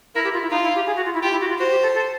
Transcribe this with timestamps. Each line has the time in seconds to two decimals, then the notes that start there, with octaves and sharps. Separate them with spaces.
0.15 E4 A#4
0.24 G4
0.33 F4
0.42 E4
0.51 D#4 F4
0.63 E4
0.75 G4
0.86 G#4
0.96 F#4
1.05 F4
1.14 E4
1.23 F4 G4
1.32 E4
1.41 F#4
1.50 F4
1.58 F#4 C5
1.71 G4
1.82 A4
1.94 A4